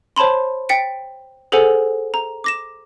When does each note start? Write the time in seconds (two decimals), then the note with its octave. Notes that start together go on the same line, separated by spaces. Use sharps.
0.16 C5 C#5 A5 B5 C6
0.69 G5 A6 B6 C#7 D7
1.52 G#4 A4 C5 F#5 G#5
2.14 A#5
2.44 D6 A#6 E7